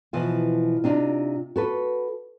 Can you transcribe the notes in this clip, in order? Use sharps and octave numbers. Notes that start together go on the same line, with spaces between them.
B2 E3 F3 F4
C3 D4 D#4 F4
F#4 A4 B4